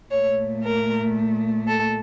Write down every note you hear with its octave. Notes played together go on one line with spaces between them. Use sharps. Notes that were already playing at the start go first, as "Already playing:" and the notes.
A#2 A3 C#5
A#4
A4